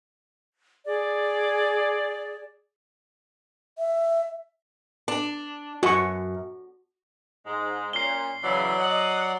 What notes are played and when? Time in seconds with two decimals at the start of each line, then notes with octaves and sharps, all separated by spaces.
0.86 G#4 D5
3.78 E5
5.08 D4
5.83 F#2 F#4 C#6
7.46 G#2 G#3
7.93 A#2 C#4 C7 G7
8.43 C#3 E3 F#3 D5
8.78 D#5 F#5